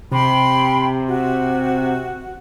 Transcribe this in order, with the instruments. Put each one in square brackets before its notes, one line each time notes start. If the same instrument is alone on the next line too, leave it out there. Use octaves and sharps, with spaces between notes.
[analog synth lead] C3 [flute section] G5 B5 C6
[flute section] F#4